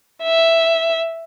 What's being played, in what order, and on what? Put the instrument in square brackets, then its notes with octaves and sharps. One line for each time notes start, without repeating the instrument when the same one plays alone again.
[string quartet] E5